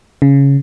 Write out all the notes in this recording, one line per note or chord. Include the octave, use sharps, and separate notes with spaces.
C#3